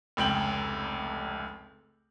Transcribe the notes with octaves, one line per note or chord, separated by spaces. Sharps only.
F1 C#2 G5 F#7